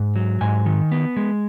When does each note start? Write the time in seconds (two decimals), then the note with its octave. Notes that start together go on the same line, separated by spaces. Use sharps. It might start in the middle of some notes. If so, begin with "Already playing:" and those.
Already playing: G#2
0.16 F#3
0.41 G#2 G#5
0.66 D#3
0.92 B3
1.17 G#3